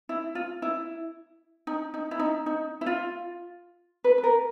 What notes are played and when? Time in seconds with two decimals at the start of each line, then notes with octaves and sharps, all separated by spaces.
0.09 E4
0.35 F4
0.62 E4
1.67 D#4
1.94 D#4
2.11 E4
2.19 D#4
2.46 D#4
2.81 E4
2.86 F4
4.04 B4
4.18 B4
4.24 A#4